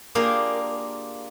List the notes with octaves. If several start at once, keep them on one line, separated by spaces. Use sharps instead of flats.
A#3 D4 F4 G4 G#4 A#4